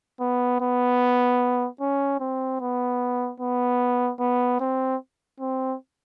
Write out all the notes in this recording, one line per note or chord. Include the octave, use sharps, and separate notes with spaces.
B3
B3
C#4
C4
B3
B3
B3
C4
C4